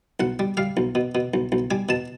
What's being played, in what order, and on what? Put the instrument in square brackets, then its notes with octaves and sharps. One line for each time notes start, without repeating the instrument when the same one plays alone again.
[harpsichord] B1 F#5
G3
G3 F5
B1
B2
B2
B1
B1
G3 G#5
B2 A5